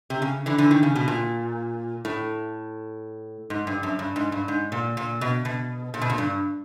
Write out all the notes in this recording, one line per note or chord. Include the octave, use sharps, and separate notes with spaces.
C3
C#3
D3 E3
D3 E3
D#3
C#3
B2
A#2
A2
G#2
G2
F#2
G2
G#2
G2
G#2
A#2
A#2
B2
B2
A#2
B2
A#2
G2